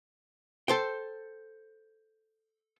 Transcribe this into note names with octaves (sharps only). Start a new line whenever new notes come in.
A4 C5 G5